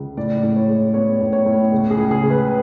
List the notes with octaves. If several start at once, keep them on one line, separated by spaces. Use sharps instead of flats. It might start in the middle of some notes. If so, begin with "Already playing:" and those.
Already playing: C#2
A2 D5
A2
C#5
G#3
B3 C#5
A2
C#5
A2
C#2
G#4
C#2
G#4
C#3
B4